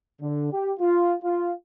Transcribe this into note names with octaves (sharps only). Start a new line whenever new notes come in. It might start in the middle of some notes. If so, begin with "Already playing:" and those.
D3
G4
F4
F4